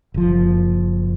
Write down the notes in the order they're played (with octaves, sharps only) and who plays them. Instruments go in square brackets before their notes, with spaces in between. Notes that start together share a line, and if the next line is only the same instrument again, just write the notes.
[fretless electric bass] F#1 F3